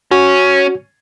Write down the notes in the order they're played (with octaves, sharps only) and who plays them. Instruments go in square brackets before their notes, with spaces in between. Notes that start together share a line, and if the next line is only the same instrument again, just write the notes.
[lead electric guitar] C#4 [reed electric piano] F#4